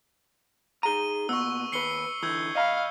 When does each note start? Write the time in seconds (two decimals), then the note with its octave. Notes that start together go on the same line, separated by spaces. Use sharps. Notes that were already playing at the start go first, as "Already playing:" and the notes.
0.83 D#4 G#4 A#5 D#7 G7
1.29 A#2 B3 C#6 E6
1.72 D#2 B4 C7 C#7 G7
2.23 D3 E3 E6 G6 G#6
2.55 D#5 F5 A#5 B5